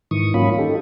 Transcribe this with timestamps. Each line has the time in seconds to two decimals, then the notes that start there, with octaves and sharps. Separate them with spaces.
0.11 G#2 D#3 E3 C#6 D#6
0.34 G#2 F#3 A#3 C#4 F4 B5
0.58 D#4 G4 A4